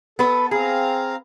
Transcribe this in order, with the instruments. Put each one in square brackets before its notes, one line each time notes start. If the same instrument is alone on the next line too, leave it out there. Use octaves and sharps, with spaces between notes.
[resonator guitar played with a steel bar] B3 B4 [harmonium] A4
[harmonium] C4 F5 A#5 [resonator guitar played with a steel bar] G#4